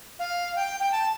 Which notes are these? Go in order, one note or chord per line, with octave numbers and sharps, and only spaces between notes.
F5
G5
G5
A5